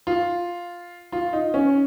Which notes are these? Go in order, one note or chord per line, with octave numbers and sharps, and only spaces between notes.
F4
F4
D#4
C#4